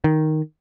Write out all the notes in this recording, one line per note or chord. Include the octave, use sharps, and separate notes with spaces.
D#3